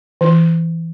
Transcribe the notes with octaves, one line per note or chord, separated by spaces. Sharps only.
E3